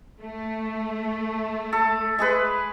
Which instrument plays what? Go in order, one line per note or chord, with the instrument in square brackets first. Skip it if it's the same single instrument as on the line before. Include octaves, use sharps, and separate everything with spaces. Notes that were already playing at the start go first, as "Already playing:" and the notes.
[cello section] A3
[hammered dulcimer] A4
G#3 G#4 B4